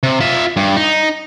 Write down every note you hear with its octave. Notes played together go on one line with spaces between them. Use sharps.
C3
F4 E5
G2
D#4